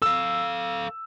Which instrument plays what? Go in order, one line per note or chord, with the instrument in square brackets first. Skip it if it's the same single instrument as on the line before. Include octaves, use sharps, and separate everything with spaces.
[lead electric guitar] A4 F5 [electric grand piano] E6